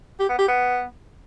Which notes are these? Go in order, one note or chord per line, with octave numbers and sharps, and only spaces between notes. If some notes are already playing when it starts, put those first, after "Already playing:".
G4
B3
G4
B3